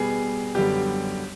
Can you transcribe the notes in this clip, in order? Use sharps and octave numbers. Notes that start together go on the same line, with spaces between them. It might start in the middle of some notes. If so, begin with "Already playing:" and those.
Already playing: B2 G3 B3 G#4
F#2 D3 G3 B3 G4